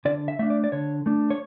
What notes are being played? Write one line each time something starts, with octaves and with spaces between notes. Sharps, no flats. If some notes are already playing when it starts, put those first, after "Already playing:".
D3 D5
E5
A3 D4 E5
D5
D5
D3 C#5
A3 D4
C#5